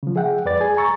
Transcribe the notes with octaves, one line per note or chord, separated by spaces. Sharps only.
C#3 F3
G#4 E5 F#5 G5
F2 B4 D5 A6
G#4 G#5
G#5 A#5 C#6 E6 A6